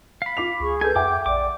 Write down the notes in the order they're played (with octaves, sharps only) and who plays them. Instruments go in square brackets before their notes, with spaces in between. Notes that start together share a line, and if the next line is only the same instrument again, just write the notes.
[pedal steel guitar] F5 B5
[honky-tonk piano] F4 D6 F7
[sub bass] C#2 [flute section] G#4 C#6
[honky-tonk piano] G#4 A4 B4 [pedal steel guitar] G#5 [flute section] G6
[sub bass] F2 [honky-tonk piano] E5 F#5 G5 [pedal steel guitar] D6
[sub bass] A#1 [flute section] D5 [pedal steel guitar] D6